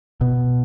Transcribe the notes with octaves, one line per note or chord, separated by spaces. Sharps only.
B2